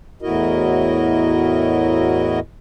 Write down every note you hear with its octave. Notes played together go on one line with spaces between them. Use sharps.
E2 A2 E4 F#4 A#4 D#5